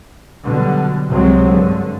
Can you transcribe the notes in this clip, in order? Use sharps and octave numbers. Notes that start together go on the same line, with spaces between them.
B2 D3 F#3 G3
C2 C3 F#3 G#3 C4
G2 D3